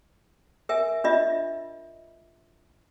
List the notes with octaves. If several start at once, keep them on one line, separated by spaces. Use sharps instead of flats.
A#4 E5 G#5
D4 F4 D#5 E5